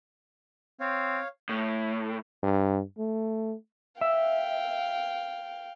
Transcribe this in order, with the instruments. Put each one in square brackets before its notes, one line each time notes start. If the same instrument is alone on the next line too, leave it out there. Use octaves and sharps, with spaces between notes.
[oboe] C4 [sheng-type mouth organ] C#5 F5
[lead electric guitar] A2
[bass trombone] G2
A3
[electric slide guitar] E5 [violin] F5 G5